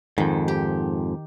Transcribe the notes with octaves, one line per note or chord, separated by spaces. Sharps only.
F2 G#2 D#3
G4